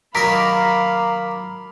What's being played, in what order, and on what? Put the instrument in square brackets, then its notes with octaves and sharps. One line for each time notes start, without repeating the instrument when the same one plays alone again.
[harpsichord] D#3 F#3 A#4 [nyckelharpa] F5 B5 [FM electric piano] A#5 D6 B6